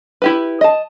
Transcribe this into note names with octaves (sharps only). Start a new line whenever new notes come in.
E4 G4 B4
D#5 A5